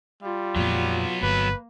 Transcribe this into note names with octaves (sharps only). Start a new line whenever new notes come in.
G3 F4
F2 A#2 F#3 B3
G1 A#3 B4